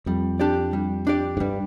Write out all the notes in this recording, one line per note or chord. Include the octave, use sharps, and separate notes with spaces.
F2 G3
D4 G4 D5
G3
D4 G4 D5
G#2
G2 G3